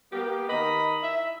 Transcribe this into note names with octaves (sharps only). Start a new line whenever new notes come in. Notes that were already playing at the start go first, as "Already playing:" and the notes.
A#3 B3 G4
D#3 D#5 A#5 B5
E5